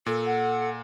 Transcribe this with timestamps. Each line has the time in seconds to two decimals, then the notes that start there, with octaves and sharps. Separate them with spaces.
0.06 A#2 A4
0.27 F#5